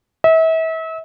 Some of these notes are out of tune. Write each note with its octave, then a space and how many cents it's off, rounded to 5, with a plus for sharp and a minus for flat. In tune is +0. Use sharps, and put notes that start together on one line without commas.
E5 -35